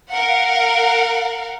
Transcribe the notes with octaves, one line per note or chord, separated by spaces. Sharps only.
A#4 F5 F#5